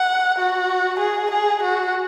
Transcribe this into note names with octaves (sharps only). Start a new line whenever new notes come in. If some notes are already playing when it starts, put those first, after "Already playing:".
Already playing: F#5
F#4
G#4
G#4
F#4